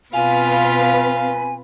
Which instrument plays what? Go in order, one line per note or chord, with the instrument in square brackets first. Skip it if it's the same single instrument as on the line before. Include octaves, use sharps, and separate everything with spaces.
[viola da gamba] B2 F4 [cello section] C4 B4 [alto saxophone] F5 [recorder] G#5